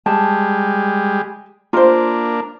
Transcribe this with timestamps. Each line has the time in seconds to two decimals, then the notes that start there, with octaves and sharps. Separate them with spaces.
0.06 G3 G#3 A5
1.73 A#3 D4 F4 A#4 C5